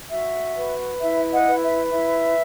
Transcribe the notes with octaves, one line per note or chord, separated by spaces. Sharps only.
F#4 E5
B4
E4 E5
D#5 F#5
B4
E5
E4 E5